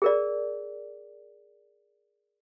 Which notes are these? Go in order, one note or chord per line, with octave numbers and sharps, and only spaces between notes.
G#4 A#4 D5